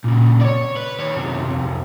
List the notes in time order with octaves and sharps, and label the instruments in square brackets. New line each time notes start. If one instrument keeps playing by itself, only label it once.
[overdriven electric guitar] A#2 C#3
C#5 D5
B4
D#3 C#5
F#2 C3
C2 F2